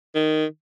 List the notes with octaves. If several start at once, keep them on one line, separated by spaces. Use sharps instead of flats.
D#3